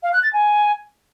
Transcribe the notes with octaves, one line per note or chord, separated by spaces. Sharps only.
F5
F#6
A6
G#5